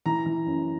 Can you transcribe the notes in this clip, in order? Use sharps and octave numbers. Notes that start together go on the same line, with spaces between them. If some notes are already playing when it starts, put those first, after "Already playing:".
E3 A#5
E3
F#2